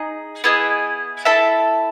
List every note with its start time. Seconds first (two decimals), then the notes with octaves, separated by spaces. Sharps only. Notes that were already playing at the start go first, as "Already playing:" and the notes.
Already playing: D#4 G#4 D#5
0.44 B3 E4 G#4 D#5
1.25 E4 A4 E5 A5